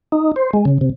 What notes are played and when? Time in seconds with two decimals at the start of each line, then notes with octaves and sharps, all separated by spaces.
0.12 D#4
0.36 C5
0.53 G#3
0.65 C#3
0.81 C3